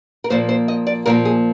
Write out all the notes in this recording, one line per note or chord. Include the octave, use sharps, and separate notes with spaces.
A#4
A#2 F3 A#3 C5
C5
D#5
D5
A#2 F3 A#3 A#4
G#4